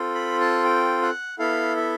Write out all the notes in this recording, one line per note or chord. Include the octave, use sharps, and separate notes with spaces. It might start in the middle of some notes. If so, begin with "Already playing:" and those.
Already playing: C4 F4 A4
B5
A5
G5
F#5
B3 E4 A4 F5
E5